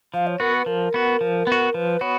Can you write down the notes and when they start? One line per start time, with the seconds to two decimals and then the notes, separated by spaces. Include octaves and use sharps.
0.13 F3 F5
0.27 C#5
0.40 B3 F#4 A#4
0.53 B4
0.66 F3 A#4
0.94 B3 F#4
1.21 F3
1.47 B3 F#4
1.74 F3 B4
2.01 B3 F#4 C#5